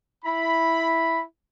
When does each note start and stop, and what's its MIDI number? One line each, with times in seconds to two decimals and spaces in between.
0.25 1.21 64
0.25 1.21 83